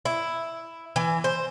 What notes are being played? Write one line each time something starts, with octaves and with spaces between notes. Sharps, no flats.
E4
E3
C5